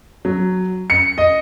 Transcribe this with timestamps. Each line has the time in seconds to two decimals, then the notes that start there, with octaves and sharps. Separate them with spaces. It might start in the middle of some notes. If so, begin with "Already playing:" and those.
0.25 F#3
0.90 C#7
1.18 D#5